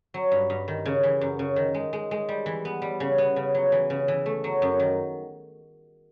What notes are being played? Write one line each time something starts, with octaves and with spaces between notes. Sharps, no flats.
F#3
G2
G2
D#3
C#3
E3
F#2
C#3
D#3
G#3
G#3
G#3
G3
E3
B3
G3
C#3
B3
C#3
F#3
E3
C#3
E3
A3
F#3
F#2
D#3